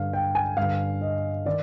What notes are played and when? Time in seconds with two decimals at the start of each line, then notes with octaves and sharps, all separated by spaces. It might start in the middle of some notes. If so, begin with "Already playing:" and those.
Already playing: G2 D3 F5
0.13 G5
0.35 G#5
0.57 G2 D3 F5
1.01 D#5
1.46 D#3 D5